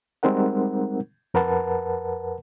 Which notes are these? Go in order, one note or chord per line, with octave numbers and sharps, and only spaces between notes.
G3 G#3 C4 D#4 A#4 F#5
F2 A#4 B4 F#5 A5